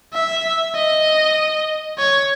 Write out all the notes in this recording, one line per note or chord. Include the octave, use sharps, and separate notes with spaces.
E5
D#5
C#5